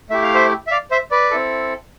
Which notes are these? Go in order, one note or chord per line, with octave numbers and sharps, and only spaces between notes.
A3 E4 G4 E5
F5
C5 E5
E5
D5 F5
C5 E5
B4 D5
C4 E4 A4